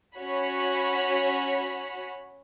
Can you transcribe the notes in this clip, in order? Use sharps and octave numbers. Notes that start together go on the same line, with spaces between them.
C#4 F#4 C#5 B5